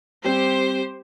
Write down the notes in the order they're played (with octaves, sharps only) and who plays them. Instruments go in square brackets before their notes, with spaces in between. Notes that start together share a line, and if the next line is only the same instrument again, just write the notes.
[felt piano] G3 C4 [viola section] G4 C5